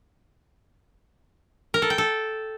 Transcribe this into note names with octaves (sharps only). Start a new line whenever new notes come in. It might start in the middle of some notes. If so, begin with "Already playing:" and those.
A#4
A4
G5
A4